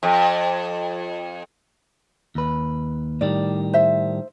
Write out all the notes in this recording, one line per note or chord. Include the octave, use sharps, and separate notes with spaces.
F2
D#2 B4
A2 D#3 G3 D5
C5 E5